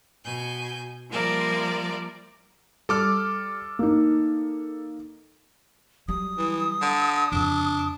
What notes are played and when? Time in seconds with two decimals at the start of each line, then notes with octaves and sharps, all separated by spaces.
0.25 B2 G#5 G6
1.10 F3 G3 A#3 A#4 D5 E5
2.89 G3 A4 D6 F6
3.79 A#3 D#4
6.08 F#3 G3 D#6
6.38 E3
6.82 D3
7.32 F2 C#3 D4